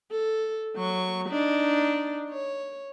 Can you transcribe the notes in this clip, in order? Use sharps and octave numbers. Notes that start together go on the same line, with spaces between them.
A4
F#3 C#6
D4 D#4
C#5